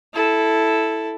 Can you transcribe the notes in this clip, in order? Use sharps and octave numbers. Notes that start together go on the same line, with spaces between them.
E4 A4